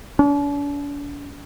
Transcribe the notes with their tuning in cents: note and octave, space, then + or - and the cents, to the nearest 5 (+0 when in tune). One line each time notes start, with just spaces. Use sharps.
D4 -45